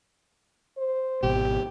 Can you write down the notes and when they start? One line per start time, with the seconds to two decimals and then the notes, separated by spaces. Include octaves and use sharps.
0.78 C5
1.23 G#1 B2 G4